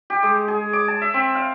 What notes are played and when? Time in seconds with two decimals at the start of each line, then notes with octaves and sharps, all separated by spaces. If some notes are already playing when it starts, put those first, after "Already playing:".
0.10 G4
0.23 G#3
0.48 G#4
0.73 D6
0.88 A5
1.01 E5
1.14 C4
1.35 F5